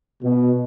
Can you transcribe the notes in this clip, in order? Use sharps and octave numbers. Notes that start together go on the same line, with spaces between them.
B2